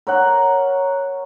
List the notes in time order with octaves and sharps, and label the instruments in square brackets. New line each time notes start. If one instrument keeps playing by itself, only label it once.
[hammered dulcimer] A#4 C#5 F#5